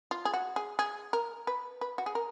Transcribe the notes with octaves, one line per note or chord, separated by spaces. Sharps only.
F4
G#4
F#4
G#4
G#4
A#4
B4
B4
F#4
G#4
A#4